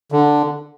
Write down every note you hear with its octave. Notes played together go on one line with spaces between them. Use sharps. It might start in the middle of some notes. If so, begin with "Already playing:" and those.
D3